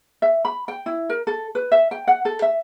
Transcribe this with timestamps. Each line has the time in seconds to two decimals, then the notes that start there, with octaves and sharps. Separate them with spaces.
0.22 E5
0.45 B5
0.68 G5
0.86 E4
1.09 A#4
1.27 A4
1.55 B4
1.72 E5
1.91 G5
2.08 F#5
2.25 A4
2.42 E5